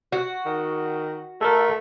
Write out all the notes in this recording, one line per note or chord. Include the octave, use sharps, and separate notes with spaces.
F#4
D#3
A3 A4 A#4